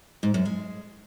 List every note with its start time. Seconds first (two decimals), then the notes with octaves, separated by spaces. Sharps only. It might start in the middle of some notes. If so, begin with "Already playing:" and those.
0.23 G#2
0.34 F#2
0.45 G#3